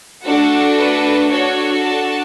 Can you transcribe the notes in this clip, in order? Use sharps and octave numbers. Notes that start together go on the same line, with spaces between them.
A3 D4 F#4 A4 F#5
B4
D4 F#4 A4 C#5
A5